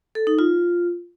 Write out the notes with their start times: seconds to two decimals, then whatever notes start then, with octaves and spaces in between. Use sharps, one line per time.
0.15 A4
0.27 D#4
0.39 F4